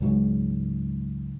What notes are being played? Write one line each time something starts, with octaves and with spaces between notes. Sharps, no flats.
C#2 G#2 F#3 G#3